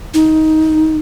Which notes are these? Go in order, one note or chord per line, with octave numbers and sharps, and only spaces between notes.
D#4